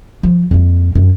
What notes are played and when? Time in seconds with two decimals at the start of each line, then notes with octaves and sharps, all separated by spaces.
0.23 F3
0.51 F2 A#3
0.95 F#2